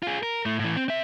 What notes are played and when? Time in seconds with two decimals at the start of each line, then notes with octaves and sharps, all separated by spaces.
0.03 F4 G#4
0.23 A#4
0.46 A2 A3
0.59 A2 E3
0.76 C4
0.88 C4 E5